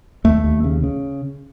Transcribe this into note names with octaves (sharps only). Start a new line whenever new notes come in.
D#2 A3
D#2
C#3
C#3